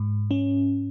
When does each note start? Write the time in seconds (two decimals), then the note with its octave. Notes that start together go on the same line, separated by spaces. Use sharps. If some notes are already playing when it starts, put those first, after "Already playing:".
Already playing: G#2
0.31 C#4